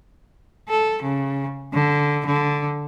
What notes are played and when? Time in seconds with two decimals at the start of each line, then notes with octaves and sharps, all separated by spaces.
0.68 A4
1.02 C#3
1.73 D3
2.26 D3